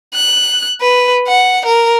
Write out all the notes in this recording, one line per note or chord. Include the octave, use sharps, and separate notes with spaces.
F#6
B4
F#5
A#4